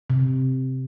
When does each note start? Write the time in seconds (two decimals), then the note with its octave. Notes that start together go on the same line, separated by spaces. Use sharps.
0.10 C3